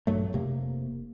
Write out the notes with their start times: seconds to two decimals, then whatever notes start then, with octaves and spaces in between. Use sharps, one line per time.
0.07 A#1 G2 F#3 A3
0.33 F1 C3 A#3